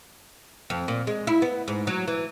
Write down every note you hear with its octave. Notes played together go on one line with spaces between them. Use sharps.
F2
A#2
G#3
E4
B3
G#2
F#3
E3